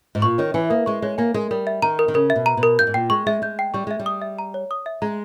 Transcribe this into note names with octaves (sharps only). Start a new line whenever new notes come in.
G#2
A#2 C#6
D#3 C#5
E3 G#5
A#3 A#4
G#3 C#6
G#3 C#5
A#3 G#5
G#3 A#4
G3 A#4
E5
D#3 A#5
A#4
D#3
C#3 A#4
E5
B2
A#5
B2
A#4
G2 G6
G#2
A#2 G5
G#3 C#6
G#3 E5
G#3 G6
G5
G3 C#6
G#3 E5
G3
D#6
E5
A#5
C#5
D#6
E5
G#3 A#5